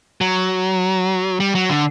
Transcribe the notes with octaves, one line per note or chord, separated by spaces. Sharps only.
F#3
G3
F#3
D3